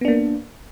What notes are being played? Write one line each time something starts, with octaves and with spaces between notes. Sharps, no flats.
A#3 B3 D4